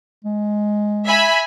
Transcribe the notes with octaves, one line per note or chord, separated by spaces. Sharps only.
G#3
E5 G#5 B5